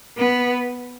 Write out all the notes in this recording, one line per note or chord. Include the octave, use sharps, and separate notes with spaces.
B3